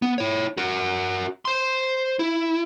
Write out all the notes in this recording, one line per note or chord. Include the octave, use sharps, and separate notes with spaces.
B3
E4 C#5
F#4 A#4
C5 C6
E4